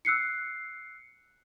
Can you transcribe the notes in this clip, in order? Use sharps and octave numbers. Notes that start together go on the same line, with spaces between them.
E6 F#6 C7 C#7